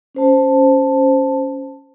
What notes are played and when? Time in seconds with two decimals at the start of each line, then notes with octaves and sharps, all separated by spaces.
0.15 C#4 C5 A5